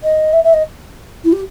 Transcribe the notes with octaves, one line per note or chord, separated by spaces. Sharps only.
D#5
E5
E5
D#5
E4
G4